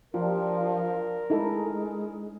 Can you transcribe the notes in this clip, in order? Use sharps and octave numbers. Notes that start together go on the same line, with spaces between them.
F3 D4 F4 G4 A#4 C5
G#3 D#4 E4 A4